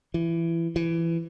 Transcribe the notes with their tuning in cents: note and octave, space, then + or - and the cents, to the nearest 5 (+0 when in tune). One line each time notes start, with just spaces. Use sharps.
E3 +20
E3 +20